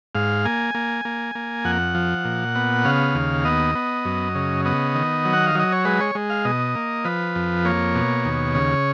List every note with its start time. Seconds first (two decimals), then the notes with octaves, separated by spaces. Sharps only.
0.15 G#2 F5
0.45 A#3 G#5
0.75 A#3
1.05 A#3
1.35 A#3
1.65 F2 F#5
1.95 F3
2.25 A#2
2.55 B3
2.85 C#3 F5
3.15 D#2
3.45 B3 D#5
3.75 B3
4.05 F#2
4.35 C#3
4.65 B3 D#5
4.95 D#3
5.25 F#3
5.33 F#5
5.46 F5
5.55 F#3 D#5
5.72 C#5
5.85 G#3 B4
6.01 C#5
6.15 G#3
6.30 F5
6.45 B2 D#5
6.76 A#3
7.05 F3 B4
7.35 F2
7.65 A#3 C#5
7.95 B2
8.25 D#2
8.55 C#3